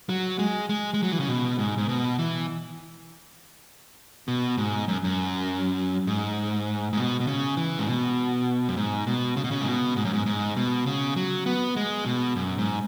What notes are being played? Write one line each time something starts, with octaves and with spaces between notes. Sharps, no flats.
F#3
G#3
G#3
G#3
F#3
E3
C#3
B2
G#2
G#2
B2
E3
B2
G#2
F#2
F#2
G#2
G#2
B2
B2
C#3
E3
G#2
B2
F#2
G#2
B2
C#3
B2
C#3
G#2
B2
G#2
F#2
G#2
G#2
B2
C#3
F#3
B3
G#3
B2
F#2
G#2